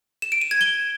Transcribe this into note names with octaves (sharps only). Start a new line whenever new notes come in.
E7
D7
D#7
G#6
G7